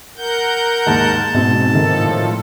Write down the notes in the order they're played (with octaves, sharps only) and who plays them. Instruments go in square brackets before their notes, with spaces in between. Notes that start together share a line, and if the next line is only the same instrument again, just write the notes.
[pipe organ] A#4 F#5 G6
[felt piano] D#2 G#2 [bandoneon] A5
[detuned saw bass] G#2 [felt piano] B2 C4
[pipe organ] A2 F3 A4 [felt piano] D#3